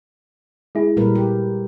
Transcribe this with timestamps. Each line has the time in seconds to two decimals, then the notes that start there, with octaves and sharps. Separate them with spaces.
0.75 G#3 E4 G#4
0.97 A#2 G3 A#4 B4
1.15 G4